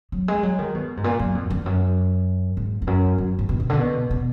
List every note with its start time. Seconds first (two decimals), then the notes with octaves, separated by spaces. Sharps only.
0.12 F#3
0.28 G#3
0.43 F#3
0.59 D#3
0.75 B2
0.97 G#2
1.04 A#2
1.19 F#2
1.35 F2
1.50 F2
1.66 F#2
2.57 G#2
2.82 F2
2.87 F#2
3.18 F#2
3.39 G#2
3.49 B2
3.60 B2
3.70 D3
3.79 B2
4.11 B2